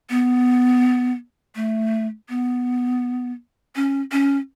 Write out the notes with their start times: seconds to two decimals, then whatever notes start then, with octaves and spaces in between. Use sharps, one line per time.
0.10 B3
1.55 A3
2.29 B3
3.76 C#4
4.12 C#4